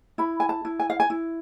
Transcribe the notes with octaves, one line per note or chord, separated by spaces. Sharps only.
E4 B5
G#5
A5
E4
G#5
F5
G#5
E4